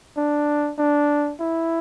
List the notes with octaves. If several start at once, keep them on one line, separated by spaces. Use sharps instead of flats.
D4
D4
E4